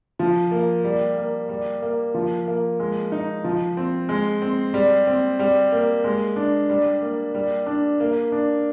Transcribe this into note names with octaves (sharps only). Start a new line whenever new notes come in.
F3
A#3
G3
A#3
G3
A#3
F3
A#3
G#3
D#4
F3
C4
G#3
C4
G3
C4
G3
A#3
G#3
D4
G3
A#3
G3
D4
A#3
D4